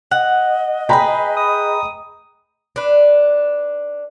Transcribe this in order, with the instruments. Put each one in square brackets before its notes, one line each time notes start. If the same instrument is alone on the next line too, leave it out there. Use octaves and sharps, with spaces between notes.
[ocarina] D#5 [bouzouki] F#5
[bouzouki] G#4 B4 [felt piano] G5 A#5 B5
[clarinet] D#6
[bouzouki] D4 B4